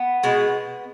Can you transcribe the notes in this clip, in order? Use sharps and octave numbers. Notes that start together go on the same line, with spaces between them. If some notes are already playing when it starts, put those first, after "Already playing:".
Already playing: B3
B2 G#3